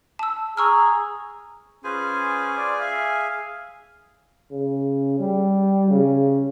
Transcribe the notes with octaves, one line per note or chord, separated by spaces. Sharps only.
A5 E6
G#4 A#5 C#6 E6 F6
C#4 F4 G#4 B4 C5 G#5
D5
E5 F5
C#3
G3
C#3